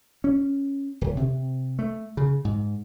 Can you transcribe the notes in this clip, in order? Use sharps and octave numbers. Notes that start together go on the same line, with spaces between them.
C#4
D1
C3
A3
C#3
G#2